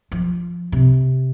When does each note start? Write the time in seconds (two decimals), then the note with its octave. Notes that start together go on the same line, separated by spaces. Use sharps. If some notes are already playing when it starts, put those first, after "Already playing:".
0.12 F3
0.72 C3